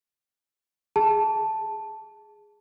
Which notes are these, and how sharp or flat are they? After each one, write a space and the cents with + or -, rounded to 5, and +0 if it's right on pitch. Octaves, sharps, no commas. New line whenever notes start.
G#4 +0 A5 +0